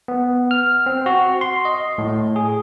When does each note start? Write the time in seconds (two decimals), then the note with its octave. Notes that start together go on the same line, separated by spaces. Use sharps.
0.08 B3
0.51 F6
0.86 C4
1.06 F#4
1.41 C6
1.65 D#5
1.98 A2
2.36 G#4